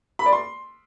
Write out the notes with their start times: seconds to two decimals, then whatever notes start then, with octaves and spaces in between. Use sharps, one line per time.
0.19 B5
0.26 D5
0.33 C6